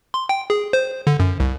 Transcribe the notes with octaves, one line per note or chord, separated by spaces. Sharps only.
C6
G5
G#4
C5
D3
F#2
C2